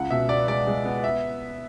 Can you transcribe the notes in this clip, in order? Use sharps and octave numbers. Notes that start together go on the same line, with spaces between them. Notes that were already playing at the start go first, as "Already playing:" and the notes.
Already playing: C#2 F#5
B2 E5
B3 D5
G#3 D5
G#3
B3
E5